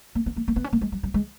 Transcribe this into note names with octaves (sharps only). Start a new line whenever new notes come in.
A#3
B3
A#3
A#3
B3
C#4
A#3
G#3
F#3
F#3
G#3